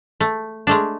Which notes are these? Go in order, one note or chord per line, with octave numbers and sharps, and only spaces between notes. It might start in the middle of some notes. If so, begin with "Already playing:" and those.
A3
G#3 A3 D4